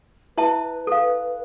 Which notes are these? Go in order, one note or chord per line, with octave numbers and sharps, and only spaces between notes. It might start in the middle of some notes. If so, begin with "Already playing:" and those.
E4 B4 E5 A5
A4 F5